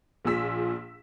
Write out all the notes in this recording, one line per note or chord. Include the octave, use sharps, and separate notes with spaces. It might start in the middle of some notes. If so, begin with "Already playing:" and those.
A#1 A#2 G#4 E6 B6